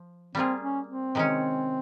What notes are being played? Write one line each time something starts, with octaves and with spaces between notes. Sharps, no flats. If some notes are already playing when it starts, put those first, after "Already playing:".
Already playing: F3
G3 A#3 C4 F4 G#4
C#4
C4
C3 D#3 G#3 C#4